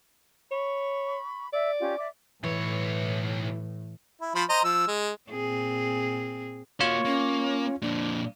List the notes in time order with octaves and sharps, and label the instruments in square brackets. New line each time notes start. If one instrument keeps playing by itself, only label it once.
[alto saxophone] C#5 [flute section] B5 C#6
[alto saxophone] D5 [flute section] E5 E6
[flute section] C#4 F4 G4
D5 E5 D6
[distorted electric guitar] B1 C#5 [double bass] A2 [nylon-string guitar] E3
[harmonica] E4
F3 C5 B5
C5 D#5 A#5
F3 E6
G#3
[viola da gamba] A#2 C4 G#4
[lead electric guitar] A#3 F#4 [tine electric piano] F4 C#5 C#6
[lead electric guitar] A#3 [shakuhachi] C#4
[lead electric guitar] F2 A#2 [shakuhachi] D4